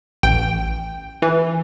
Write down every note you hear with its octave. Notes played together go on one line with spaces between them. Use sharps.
A1 G5
E3